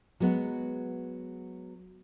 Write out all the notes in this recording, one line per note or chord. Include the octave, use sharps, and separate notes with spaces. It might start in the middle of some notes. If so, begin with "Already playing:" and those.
F#3 G#3 B3